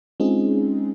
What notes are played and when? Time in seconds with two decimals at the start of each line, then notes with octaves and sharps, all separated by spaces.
0.20 G#3 C4 C#4 D#4 F4 G#4